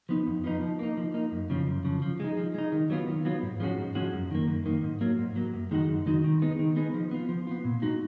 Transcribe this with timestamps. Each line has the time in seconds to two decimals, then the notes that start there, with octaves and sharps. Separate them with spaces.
0.09 F3 B3 D#4
0.27 F2
0.44 F3 B3 D#4
0.62 F3
0.79 A#3 D#4
0.97 F3
1.14 A#3 D#4
1.32 F#2
1.50 C#3 F3
1.67 F#2
1.85 C#3 F3
2.02 F3
2.20 G#3 D#4
2.37 F3
2.54 G#3 D#4
2.72 D#3
2.90 F#3 B3 F4
3.08 D#3
3.25 F#3 B3 F4
3.43 G#2
3.60 F3 G#3 C#4 F#4
3.78 G#2
3.95 F3 G#3 C#4 F#4
4.13 F#2
4.31 D#3 A#3
4.48 F#2
4.66 D#3 A#3
4.83 G#2
5.01 F#3 A#3
5.19 G#2
5.36 F#3 A#3
5.54 F#2
5.71 D#3 G#3 D#4 F#4
5.89 F#2
6.06 D#3 G#3 D#4 F#4
6.24 D#3
6.42 G#3 B3 D#4
6.59 D#3
6.76 G#3 B3 D#4
6.94 F3
7.11 B3 F4
7.29 F3
7.47 B3 F4
7.65 A#2
7.82 G#3 D#4 F#4